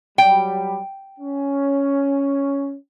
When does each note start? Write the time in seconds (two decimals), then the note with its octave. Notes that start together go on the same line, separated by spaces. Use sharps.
0.18 F#3 G3 G5
1.19 C#4